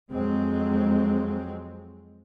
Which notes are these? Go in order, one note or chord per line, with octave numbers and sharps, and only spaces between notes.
F2 F#3 G#3 C4